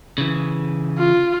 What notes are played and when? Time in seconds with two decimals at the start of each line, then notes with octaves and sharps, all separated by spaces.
0.18 C#3 E3
0.99 F4